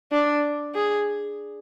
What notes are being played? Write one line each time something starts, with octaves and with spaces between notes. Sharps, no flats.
D4
G#4